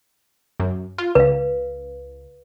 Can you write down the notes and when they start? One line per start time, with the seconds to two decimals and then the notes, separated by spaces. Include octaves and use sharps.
0.60 F#2
0.98 F4
1.15 C#2 B4 F5